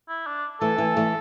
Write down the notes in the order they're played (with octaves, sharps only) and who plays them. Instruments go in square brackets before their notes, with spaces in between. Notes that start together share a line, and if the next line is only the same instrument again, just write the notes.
[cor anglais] E4
D4
[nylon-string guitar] E3 A3 [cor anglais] A4
[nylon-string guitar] E3
E3 A3